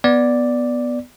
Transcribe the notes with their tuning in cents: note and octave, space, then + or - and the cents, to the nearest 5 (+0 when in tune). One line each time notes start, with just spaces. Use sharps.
B3 +0 D5 +0